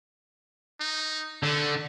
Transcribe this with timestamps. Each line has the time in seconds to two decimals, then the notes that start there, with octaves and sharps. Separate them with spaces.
0.80 D#4
1.43 D3 A3